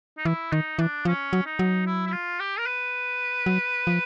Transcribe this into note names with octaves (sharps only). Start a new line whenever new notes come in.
D#4
E3 E4
D#3 D#4
E3 D4
F3 C#4
F#3
D#4
F#3
E4
E4
F4
G4
A#4
B4
F#3
F3